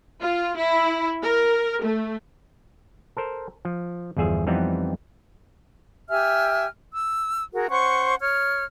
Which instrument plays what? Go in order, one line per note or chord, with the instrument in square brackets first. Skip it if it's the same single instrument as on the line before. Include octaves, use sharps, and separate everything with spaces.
[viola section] F4
E4
A#4
A3
[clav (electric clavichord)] A4 A#4 C5
F3
G1 E2 F3 G#4 E5
F2 E3 G3 B3 C4 D#4
[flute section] G4 E5 G#5 F6
E6
F#4 G#4 A#4
C#4 C5 F#5 C#6
C#5 F6